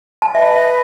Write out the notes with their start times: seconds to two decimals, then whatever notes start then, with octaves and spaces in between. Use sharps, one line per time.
0.22 A5
0.35 B4 D#5 E5